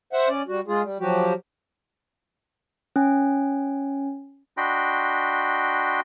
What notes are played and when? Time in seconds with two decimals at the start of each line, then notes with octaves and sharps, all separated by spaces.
0.13 C5 E5 F#5
0.29 C#4 D5
0.48 G3 F#4
0.68 G#3 F4 G#4
0.83 G3
1.00 F3 F#3 F#4 G4
2.96 C#4 G#5
4.57 D4 F#4 D#5 G5 B5 C6